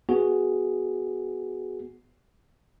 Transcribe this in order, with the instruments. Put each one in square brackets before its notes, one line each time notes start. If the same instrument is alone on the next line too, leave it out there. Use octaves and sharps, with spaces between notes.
[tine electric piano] B3 F#4 G#4